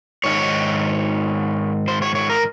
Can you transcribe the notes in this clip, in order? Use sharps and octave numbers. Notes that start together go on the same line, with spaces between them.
G#2 D#3 C#5
C5
C#5
C#5
A#4